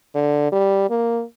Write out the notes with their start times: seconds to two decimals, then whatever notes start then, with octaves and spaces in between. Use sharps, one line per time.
0.15 D3
0.52 G3
0.90 A#3